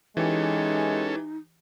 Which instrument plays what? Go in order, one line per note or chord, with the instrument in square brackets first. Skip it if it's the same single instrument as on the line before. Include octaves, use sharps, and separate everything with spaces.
[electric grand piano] E3 G4 [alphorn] G#3 [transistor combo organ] C#4 A4 [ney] D#4